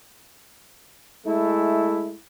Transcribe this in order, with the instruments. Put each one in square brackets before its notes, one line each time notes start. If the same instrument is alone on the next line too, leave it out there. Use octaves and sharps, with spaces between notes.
[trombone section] G#3 A3 E4